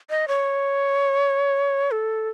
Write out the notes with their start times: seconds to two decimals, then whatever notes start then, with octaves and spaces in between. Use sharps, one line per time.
0.10 D#5
0.28 C#5
1.91 A4